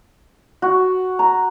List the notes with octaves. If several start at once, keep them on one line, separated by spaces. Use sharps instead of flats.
F#4
A#5